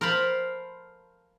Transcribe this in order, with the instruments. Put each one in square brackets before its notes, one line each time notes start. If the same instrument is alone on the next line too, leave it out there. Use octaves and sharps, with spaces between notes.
[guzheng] A#4 C5 F5 A5 B5